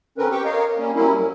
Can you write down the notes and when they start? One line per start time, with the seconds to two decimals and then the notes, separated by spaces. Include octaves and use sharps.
0.18 D3 C4 C#4 A#4 B4
0.31 G4 G5 C#6 D6
0.45 A#4 C#5 D#5 F5
0.78 G3 A#3 C#4
0.95 F#3 G3 A#3 C#4 E4
1.13 F#2